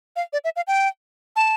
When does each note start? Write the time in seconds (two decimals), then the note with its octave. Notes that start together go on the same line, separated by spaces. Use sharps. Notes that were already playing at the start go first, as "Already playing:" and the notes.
0.16 F5
0.33 D5
0.44 E5
0.56 F5
0.67 G5
1.36 A5